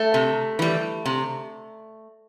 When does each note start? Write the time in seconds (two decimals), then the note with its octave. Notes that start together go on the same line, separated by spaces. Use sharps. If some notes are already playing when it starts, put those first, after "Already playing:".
Already playing: A3
0.14 C3
0.59 E3 G3
1.06 C3